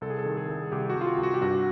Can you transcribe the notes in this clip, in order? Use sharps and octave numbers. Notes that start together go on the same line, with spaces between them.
C2 A4
G#4
A4
D#3
G#4
C2
C2 G4
F#4
C2
F4
F#4
C2
F#4
G4
G2 F#4